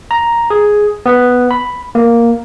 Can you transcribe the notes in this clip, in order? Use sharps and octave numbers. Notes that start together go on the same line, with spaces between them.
A#5
G#4
B3
B5
A#3